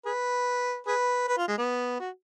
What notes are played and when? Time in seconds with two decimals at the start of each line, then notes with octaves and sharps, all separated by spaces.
0.05 G#4 B4
0.87 G#4 B4
1.28 B4
1.38 F4
1.48 G#3
1.58 B3
2.00 F#4